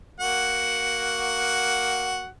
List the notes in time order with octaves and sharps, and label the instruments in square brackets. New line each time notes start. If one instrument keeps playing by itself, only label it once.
[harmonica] A#3 F#4 F#5